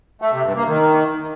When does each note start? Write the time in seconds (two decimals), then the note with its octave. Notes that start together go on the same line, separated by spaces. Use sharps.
0.22 A3
0.33 C3
0.44 G2
0.56 A#3
0.67 D#3